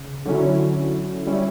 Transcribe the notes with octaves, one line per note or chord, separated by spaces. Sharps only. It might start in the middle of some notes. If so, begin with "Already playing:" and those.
Already playing: C#3
D3 F#3 C#4 E4
G3 C#4 E4